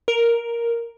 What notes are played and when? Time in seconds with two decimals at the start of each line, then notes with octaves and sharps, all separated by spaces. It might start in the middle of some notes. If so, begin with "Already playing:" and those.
0.08 A#4